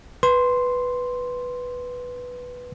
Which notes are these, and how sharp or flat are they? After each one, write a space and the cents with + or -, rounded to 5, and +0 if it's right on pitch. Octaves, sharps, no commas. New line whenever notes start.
B4 +0 C6 +0